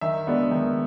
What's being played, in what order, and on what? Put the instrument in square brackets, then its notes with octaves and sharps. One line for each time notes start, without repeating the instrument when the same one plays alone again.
[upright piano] D#3 E5
G#3 B3 D4
D#3